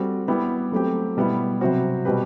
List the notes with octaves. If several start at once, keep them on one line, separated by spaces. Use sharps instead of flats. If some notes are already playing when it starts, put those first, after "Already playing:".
Already playing: G3 C4 F#4 A4
G3 B3 E4 G4
F#3 A3 C4 G4
B2 G3 B3 E4
C3 F#3 C4 F#4 C5
B2 G3 C4 G4 B4